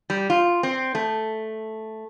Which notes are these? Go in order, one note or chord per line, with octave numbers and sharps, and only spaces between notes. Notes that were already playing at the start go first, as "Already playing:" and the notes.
G3
F4
C4
A3